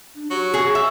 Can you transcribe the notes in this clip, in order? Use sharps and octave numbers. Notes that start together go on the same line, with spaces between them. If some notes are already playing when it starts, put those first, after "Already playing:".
D4
F#3 G4
G#4 C#6
E5